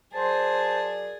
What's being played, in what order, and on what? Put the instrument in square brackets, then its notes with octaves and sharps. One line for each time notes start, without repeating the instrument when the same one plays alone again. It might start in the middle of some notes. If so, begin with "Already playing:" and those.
[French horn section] F#3 A#4 D5 [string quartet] G#4 [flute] C5 [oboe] A5